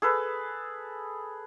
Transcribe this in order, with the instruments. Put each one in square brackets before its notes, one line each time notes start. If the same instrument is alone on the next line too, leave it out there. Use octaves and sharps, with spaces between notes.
[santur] G#4 A4 B4